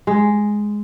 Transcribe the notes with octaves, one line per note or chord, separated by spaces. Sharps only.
G#3